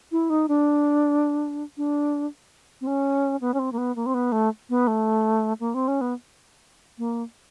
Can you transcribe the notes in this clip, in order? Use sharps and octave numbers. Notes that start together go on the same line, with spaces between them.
E4
D#4
D4
D4
C4
C#4
B3
C#4
C4
A#3
B3
A#3
C4
B3
A3
B3
A3
A#3
C4
C#4
B3
A#3